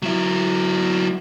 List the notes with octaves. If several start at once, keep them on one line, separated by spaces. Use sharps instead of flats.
F#3 E4